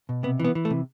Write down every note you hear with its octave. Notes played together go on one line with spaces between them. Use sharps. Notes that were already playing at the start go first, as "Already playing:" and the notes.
B2
C3 B3
E3
B3
E3
A3
C3